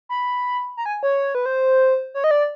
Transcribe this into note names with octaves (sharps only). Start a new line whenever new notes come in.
B5
A#5
G#5
C#5
B4
C5
C#5
D#5
D5